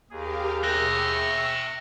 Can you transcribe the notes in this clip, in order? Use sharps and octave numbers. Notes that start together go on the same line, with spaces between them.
D#2 G4 G#4 A#4 F5
E5 G5 C#6 E6 F#6 A#6